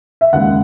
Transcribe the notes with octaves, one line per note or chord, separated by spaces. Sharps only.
E5
D#2 C#3 G#3 F#5